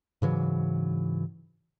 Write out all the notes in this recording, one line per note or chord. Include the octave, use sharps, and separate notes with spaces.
G#2 C#3 E3 F#3